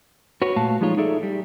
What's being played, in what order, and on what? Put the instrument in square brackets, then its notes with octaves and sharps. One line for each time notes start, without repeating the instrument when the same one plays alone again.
[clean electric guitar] F#4 B4 C#5
A#2 A3 F#4 F5 A5
F3 G3 G#3 D#4 F4 C#5
D#4 G#4 A4 D5 E5
G3